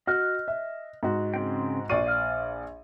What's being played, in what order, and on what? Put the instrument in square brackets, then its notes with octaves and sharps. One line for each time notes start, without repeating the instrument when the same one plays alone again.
[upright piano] F#4 [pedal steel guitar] D#5 F6 F#6
[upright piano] E5
G#2 F#4
[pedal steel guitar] C#3 C4 G5
[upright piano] A#1 D5 D#7 [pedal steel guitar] F4 F#4 C#6
[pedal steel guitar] F5 F6